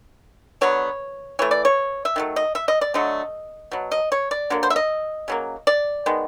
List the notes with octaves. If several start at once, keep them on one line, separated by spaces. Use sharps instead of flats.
D3 F#3 B3 C#5
E3 A3 C#5
D5
C#5
E5
D#3 F#3 A3
D#5
E5
D#5
D5
D3 F#3 A3 D#5
B2 F#3
D#5
C#5
D5
D3 F#3 A#3
C5
E5
D#5
C#3 F#3 A#3
D5
D#3 G#3 B3